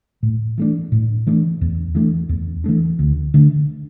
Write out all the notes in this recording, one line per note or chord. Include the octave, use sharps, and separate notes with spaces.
A2
E3 A3 D4
A2
E3 A3 D4
E2
E3 A3 D4
E2
E3 A3 D4
D2
D3 A3 D4